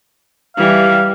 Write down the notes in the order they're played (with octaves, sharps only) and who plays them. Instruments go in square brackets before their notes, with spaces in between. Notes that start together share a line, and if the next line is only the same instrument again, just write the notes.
[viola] E3 G3 [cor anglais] F5